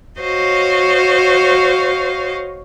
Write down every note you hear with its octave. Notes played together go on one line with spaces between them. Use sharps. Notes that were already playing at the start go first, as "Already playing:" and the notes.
F#4 C5 C#5 D#5 F5